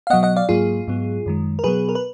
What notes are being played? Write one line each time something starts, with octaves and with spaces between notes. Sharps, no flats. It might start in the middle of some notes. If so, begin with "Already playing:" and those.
F5
B2 F#3 B3 D#5 F#5
D#5 F#5
D5 F5
G#2 F#3 A#3 F4 G#4
G#2 F#3 B3
F#2 D#3 G#3
A#4
B2 F#3 B3 G#4 B4
A#4
B4